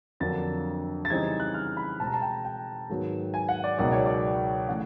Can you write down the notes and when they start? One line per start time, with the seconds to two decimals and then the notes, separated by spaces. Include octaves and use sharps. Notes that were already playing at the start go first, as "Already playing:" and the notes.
0.20 F2 D3 F#3 A#3 D4 A6
1.05 A6
1.10 C#3 E3 G3 C4 D#4 G#6
1.40 F#6
1.54 F6
1.77 B5
2.00 B2 G#3 C4 A5
2.07 A#5
2.14 A5
2.22 G5
2.45 G5
2.89 G#2 D#3 F#3 B3
3.34 G#5
3.49 F#5
3.64 D5
3.78 C#2 B2 F#3 A#3 D#4 D5
3.92 C#5
4.06 D5
4.68 C#3 E3 A3 F#5